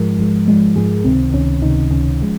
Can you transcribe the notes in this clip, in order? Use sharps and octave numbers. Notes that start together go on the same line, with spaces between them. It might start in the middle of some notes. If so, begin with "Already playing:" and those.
Already playing: G#2 F3 G#3 A#4
G#2 F3 G#3
G#2 F3 G#3
G#2 F3 G#3 G#4
C#2 C3 D#3 C4
C#2 C3 D#3 C#4
C#2 C3 D#3 D#4
C#2 C3 D#3 C#4
F3 G#3